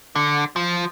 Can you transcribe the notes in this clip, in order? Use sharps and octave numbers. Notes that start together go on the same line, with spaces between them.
D3
F3